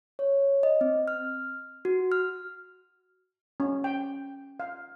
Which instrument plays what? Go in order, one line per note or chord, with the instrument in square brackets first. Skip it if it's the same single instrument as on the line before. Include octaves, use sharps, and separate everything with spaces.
[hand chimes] C#5
D#5
C4
F6
F#4
F6
[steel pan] C#4
G5
F5